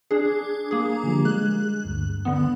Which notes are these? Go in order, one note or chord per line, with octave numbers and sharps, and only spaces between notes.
D4 G#4
A#3 G#4
D3 F3 G3
G#3 F#6
D2 G2
D3 B3